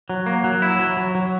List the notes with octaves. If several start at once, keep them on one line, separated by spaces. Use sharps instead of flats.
F#3
A#3
F#3
E4
F#3
F#3
F#3